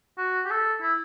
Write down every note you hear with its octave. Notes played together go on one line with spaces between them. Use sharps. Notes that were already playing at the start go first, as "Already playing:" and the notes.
F#4
G4
A4
E4